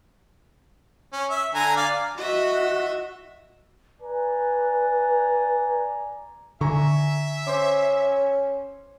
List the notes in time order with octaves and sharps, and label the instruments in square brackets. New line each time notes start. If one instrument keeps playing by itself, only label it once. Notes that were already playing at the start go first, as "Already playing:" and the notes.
[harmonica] C#4
E5
D3 G#5 A#5
D5 F5
[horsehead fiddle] F#4 [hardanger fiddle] D#5 E5
[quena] B4 [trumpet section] D5 G#5 A#5
[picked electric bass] D3 [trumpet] E5 [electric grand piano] G#5 A#5 C#6
[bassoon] C#4 [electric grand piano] C5 C6 D6